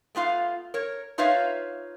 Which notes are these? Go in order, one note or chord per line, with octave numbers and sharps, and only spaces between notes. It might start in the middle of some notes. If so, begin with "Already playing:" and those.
A3 B3 F4 F5
A#4 C#5
D#4 F4 B4 C#5 E5 F5